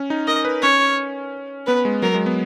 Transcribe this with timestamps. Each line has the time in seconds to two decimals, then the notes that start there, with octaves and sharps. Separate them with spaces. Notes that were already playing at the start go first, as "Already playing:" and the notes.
Already playing: C#4
0.10 D#4
0.27 A#4 D#5
0.45 B4
0.62 C#4 C#5
1.67 B3 B4
1.85 G#3
2.02 F#3 A#4
2.14 G#3
2.26 B3